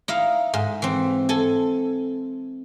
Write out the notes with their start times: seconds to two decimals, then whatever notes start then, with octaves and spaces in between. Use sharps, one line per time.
0.08 D#4 E4 F5
0.54 G#2
0.82 E3 C4
1.29 A4 G#5